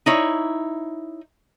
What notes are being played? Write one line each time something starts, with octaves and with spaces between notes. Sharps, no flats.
D#4 E4 C#5